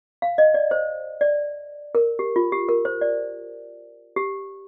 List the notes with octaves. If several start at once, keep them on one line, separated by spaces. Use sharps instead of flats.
F5
D#5
D5
C5
D5
A#4
G4
F4
G4
A#4
C5
D5
G4